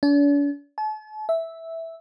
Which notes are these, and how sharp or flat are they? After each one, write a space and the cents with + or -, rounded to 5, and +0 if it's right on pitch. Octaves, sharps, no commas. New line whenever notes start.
D4 -45
A5 -40
E5 -5